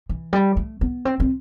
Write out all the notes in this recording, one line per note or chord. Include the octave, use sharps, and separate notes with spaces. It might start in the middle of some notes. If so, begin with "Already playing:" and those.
E3
G3
A3
B3
C4
C4